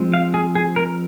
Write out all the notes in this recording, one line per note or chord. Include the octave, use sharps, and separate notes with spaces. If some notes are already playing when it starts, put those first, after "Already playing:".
Already playing: F3 G#3 C4
F5
G#4
G#4
A#4